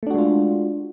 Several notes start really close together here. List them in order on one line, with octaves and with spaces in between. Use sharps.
A3 D4 F#4 G#3 F4